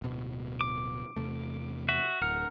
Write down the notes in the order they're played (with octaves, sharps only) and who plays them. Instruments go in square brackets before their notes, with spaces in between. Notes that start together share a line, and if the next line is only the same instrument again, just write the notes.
[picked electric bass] D1 B2
[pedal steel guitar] D6
[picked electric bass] E2 C3 A3
[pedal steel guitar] F#4 E5
[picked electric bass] D1 [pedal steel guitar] A#4 F#5 F6